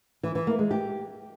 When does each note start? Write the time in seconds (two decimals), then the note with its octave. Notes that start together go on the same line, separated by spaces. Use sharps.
0.23 E3
0.35 E3
0.47 A#3
0.59 G#3
0.71 G4